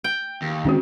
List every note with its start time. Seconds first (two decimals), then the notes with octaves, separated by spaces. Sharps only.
0.04 G5
0.42 D#2
0.65 D#3 G#3 C4 C#4 F#4